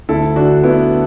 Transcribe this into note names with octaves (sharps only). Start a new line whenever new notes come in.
D2 E4 A4
D3 D4 F#4
D3 B3 E4